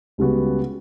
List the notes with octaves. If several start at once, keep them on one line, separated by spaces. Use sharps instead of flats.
C#2 C#3 G3 B3 F#4